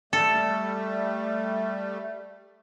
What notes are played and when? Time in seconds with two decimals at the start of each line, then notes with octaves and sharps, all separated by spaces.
0.13 G3 A3 A4